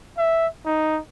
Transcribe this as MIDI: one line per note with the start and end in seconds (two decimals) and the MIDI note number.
0.18 0.47 76
0.65 1.00 63